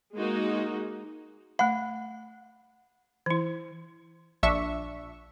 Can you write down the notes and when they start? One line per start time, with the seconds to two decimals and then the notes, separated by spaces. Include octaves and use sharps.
0.15 G#3 A#3 D#4 F#4
1.59 A3 F#5 B5
3.26 E3 E4
4.43 A#1 D4 E5 C#6